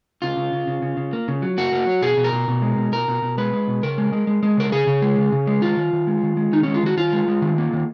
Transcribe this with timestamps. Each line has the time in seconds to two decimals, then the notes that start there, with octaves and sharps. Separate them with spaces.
0.22 C#3 F4
0.37 C#3
0.52 C#3
0.67 C#3
0.82 C#3
0.97 C#3
1.13 A#3
1.28 C#3
1.42 F#3
1.58 A#3 F#4
1.72 A#3
1.87 F#3
2.02 B2 G#4
2.17 B2
2.24 A#4
2.32 B2
2.48 B2
2.62 G#3
2.77 B2
2.92 B2 A#4
3.08 B2
3.22 B2
3.38 G#3 B4
3.53 G#3
3.67 B2
3.83 C#3 A#4
3.98 G#3
4.12 G#3
4.27 G#3
4.43 G#3
4.57 C#3 A#4
4.72 C#3 G#4
4.87 C#3
5.02 G#3
5.18 C#3
5.32 C#3
5.47 G#3
5.62 D#3 F4
5.77 D#3
5.93 D#3
6.07 G#3
6.23 D#3
6.37 G#3
6.53 D#3 D#4
6.63 G#3 C#4
6.74 F4
6.83 D#3 F#4
6.97 D#3 F4
7.13 G#3
7.28 G#3
7.42 D#3
7.58 A#3
7.73 D#3